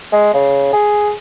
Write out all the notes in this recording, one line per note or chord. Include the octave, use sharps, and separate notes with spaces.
G#3
C#3
G#4